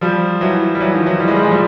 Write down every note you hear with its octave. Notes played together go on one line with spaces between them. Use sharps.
F3 G3
E3 F#3
G3
E3 F#3
D#3 F3
E3 F#3
G3
G#3
G3
G#3
F3 G3